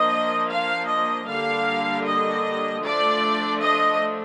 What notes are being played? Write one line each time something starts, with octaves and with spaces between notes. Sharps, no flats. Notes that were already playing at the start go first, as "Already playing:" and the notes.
Already playing: F3 A#3 D4 D#5
F5
D#5
D3 G3 A#3 D4 F5
D#5
F3 A3 D4 D5
D#5